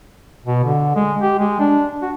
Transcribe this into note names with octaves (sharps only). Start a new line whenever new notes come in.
B2
D3
G#3
G4
G#3
D4
F#4